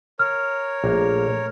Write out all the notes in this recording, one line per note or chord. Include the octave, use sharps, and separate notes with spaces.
A#4 C#5 F6
A#1 A#2 A3 A#3